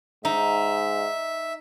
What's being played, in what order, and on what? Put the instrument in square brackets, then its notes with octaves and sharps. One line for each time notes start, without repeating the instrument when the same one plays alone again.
[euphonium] G#2 [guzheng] D#4 [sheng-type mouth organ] E5